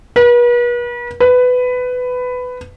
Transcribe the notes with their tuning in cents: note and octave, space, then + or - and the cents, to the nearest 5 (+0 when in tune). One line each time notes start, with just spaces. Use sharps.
B4 -40
B4 +15